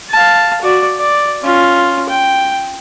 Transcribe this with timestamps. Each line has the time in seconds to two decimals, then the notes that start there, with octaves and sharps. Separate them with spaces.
0.10 F5 A5
0.62 F#4 D5
0.99 D5
1.43 C#4 F4
2.09 G5